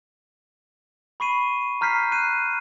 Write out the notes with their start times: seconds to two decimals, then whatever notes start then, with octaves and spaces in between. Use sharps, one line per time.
1.20 B5 C#6 C7 D#7
1.81 A#5 F6 G6 B6 C7
2.12 F#6 C7 D#7